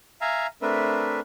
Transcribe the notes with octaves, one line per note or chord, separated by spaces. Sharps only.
E5 F5 G#5 A#5
A3 C4 D4 A#4 B4 E5